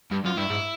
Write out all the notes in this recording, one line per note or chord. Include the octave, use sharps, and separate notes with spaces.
G2
F#2 F4
G2 E4
G#2